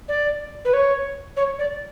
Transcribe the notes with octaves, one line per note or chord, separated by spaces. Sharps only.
D5
B4
C#5
C#5
D5